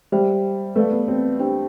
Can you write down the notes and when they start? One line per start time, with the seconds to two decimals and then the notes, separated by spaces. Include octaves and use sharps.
0.12 G3 C5 E5 G5
0.76 A3 B4 D5 F5
0.91 B3
1.08 C4
1.39 D4 G4 C5 G5